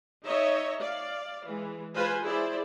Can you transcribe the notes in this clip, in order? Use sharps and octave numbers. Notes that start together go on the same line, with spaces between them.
D#4 C#5 D#5 E5
D5 F5
E3 G#3
G#3 F4 B4 C5 G#5
E4 G#4 C5 D5